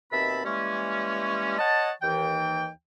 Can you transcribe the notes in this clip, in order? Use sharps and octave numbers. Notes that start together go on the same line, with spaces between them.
D#2 B2 C4 E5 A5 B5
E3 G3 G#3 A#3 C#4
C#5 D#5 F#5 A5
D#2 E3 G5